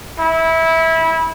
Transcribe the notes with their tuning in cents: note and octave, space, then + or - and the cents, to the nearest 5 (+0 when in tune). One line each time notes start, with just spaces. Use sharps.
E4 -20